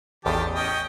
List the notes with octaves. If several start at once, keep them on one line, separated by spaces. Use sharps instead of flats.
A1 E2 D#3 G4 A5
C#4 D#5 G5